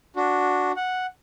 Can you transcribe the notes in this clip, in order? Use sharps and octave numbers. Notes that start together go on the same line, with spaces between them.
D4 F#4
F#5